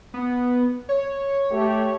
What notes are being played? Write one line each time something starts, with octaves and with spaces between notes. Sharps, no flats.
B3
C#5
A3 G4